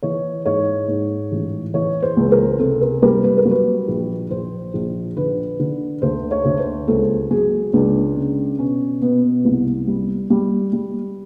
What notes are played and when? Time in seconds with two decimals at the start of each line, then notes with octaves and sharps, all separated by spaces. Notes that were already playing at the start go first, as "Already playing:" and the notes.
0.02 E3 C#5
0.46 G#2 C#5
0.88 G#2
1.31 A1
1.74 E3 C#5
2.02 C5
2.17 C#2
2.32 A#4
2.59 C3 A4
2.81 A#4
3.02 G3 A#4
3.24 B4
3.37 A#4
3.45 F#3
3.51 B4
3.88 A#1
4.31 A#1 C5
4.74 A#1
5.16 D3 B4
5.60 D3
6.02 D2 C5
6.31 C#5
6.45 D2
6.59 C5
6.88 C#2 A4
7.31 F#3 G#4
7.73 C#2 D4
8.16 C#3
8.59 B2 C#4
9.02 B2 B3
9.45 C2
9.87 G3
10.30 G3
10.73 G3